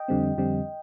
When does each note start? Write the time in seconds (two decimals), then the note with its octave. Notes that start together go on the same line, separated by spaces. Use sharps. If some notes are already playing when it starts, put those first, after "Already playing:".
Already playing: D#5 G5
0.08 F2 D3 G3 C4
0.38 F2 D3 G3 C4